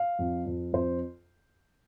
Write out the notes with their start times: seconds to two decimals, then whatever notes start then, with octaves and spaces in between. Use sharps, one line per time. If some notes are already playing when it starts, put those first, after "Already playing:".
Already playing: F5
0.19 F2
0.46 F2
0.73 F2 C5